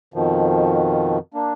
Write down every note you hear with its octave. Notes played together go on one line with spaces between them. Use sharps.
F2 B2 D#3 F3
A#3 D4